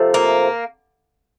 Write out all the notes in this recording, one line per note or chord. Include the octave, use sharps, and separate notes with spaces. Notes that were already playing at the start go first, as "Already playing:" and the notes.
Already playing: C3 F3 A3
A#3